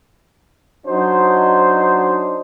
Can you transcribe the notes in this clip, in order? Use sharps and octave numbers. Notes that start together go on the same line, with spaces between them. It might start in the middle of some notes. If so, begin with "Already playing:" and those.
F#3 D4 D#4 C5